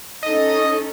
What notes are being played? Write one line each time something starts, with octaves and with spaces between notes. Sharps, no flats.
C#4 D#4 A4 D#5